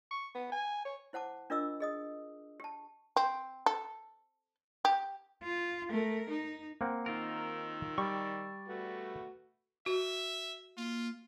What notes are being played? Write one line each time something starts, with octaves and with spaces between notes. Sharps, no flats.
C#6
B3
G#5
C#5
E4 C5 F#5 A5 D6
D4 F4 A#4 D#5 D6 E6
G#4 D#5 D#6
G4 A5
C4
A4
G4
F4
A3 A#4
D#4
A#3 C4 F#5
D#3 D#4 F4 A#4 E6
G3 D5 C#6
A3 F#4 B4
F#4 E5
A#3 F4